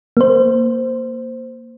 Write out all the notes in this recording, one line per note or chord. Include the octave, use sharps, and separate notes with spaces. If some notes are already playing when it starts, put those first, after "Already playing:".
A#3 C5